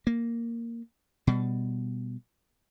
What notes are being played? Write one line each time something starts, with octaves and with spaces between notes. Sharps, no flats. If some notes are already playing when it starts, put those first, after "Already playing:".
A#3
B2 G3